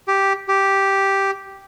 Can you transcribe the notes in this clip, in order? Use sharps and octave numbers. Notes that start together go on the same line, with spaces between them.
G4
G4